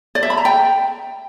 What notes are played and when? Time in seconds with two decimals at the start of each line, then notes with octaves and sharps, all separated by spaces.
0.15 D5
0.23 E5
0.30 B5
0.38 A#5
0.45 G5